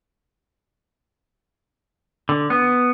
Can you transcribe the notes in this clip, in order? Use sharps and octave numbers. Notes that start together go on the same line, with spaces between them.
D3
B3